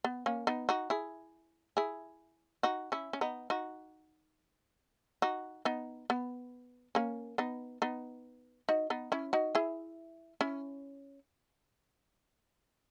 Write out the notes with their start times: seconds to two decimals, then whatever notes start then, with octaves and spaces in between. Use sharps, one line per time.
0.04 B3
0.26 A#3 C#4
0.47 B3 D#4
0.69 D#4 F#4
0.90 E4 G#4
1.77 E4 G#4
2.63 D#4 F#4
2.92 C#4 E4
3.13 C#4
3.21 B3 D#4
3.50 D#4 F#4
5.22 D#4 F#4
5.65 B3 D#4
6.10 B3
6.95 A#3 C#4
7.38 B3 D#4
7.82 B3 D#4
8.69 D#4 F#4
8.90 B3 D#4
9.12 C#4 E4
9.33 D#4 F#4
9.55 E4 G#4
10.41 C#4 E4